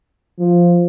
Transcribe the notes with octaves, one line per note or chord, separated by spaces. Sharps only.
F3